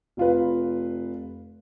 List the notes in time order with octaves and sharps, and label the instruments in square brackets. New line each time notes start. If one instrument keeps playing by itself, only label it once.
[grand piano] F1 F4 B4